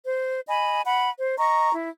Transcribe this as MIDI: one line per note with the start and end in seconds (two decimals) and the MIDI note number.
0.05 0.41 72
0.48 0.81 75
0.48 0.81 80
0.48 0.81 83
0.85 1.10 78
0.85 1.10 83
1.20 1.38 72
1.39 1.72 75
1.39 1.72 82
1.39 1.72 85
1.72 1.89 64